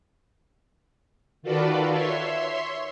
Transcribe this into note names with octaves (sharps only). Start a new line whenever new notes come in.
D#3 F4 F#4 A4 B4 D5
C#5 E5 C6